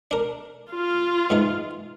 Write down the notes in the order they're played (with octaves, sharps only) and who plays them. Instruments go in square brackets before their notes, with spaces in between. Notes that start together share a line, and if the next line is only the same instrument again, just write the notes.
[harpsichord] D4 A#4
[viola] F4 F5
[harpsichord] G#2 E3 D#4